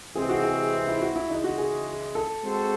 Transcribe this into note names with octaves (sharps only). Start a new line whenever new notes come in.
C3 E3 G#3 C4 G#4
F#4
G#4
E4
F#4
E4
C#3 E3 G#3 D#4
F#4
G#4
A4
G#3 C4 F#4 A4 C5